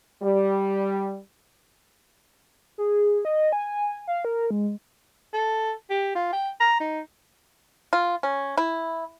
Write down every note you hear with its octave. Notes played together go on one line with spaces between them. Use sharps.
G3
G#4
D#5
G#5
F5
A#4
G#3
A4
G4
F4
G5
A#5
D#4
F4
C#4
E4